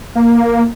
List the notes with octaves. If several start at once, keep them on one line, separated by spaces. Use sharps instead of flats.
A#3